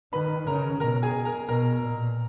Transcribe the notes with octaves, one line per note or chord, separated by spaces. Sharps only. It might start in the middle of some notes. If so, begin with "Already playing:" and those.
D#3 B4 B5
C#3 A#4 A#5
B2 A#4 A#5
G#4 G#5
A#4 A#5
B2 A#4 A#5
A#2